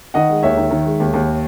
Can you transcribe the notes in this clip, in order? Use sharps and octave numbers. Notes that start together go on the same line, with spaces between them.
D#3 D#5 F#5
G#3
D#2 C#5 E5
D#3
D#3
G#3
D#2
D#2